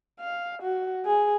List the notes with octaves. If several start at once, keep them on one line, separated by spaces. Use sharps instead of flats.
F5
F#4
G#4